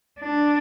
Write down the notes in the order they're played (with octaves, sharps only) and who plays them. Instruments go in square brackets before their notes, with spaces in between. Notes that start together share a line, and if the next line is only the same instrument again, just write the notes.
[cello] D4